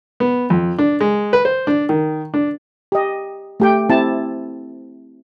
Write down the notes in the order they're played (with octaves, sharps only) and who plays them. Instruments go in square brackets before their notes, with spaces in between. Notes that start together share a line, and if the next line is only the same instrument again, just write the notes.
[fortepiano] B3
F2
D4
G#3
B4
C5
D4
D#3
D4
[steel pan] G4 D#5
A3 G4 G5
C4 E4 G4 A5